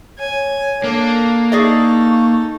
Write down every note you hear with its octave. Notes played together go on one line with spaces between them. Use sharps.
C#5 G#5
A#3 D4 A4
D#4 G#4 A4 D5 D#5 C#6